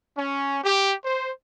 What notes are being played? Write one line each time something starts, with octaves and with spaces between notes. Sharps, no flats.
C#4
G4
C5